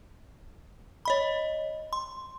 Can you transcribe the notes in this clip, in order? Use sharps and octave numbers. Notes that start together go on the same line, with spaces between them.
C#5 D#5 B5
C6